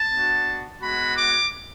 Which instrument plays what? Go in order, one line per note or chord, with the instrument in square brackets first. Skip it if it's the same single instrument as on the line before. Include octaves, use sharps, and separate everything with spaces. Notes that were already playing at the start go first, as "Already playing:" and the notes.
Already playing: [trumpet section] A5
B3 D4 F#4
G#3 B3 F#4 B5
D6